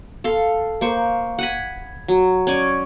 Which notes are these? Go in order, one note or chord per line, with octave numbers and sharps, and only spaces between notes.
A4 F5 C6
A#3 C5 C#6
F#5 G#5 B5
F#3
C#4 D5 G#5